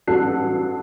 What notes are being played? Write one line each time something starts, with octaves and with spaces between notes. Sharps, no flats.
A1 G2 F#3 A4 F#6 C7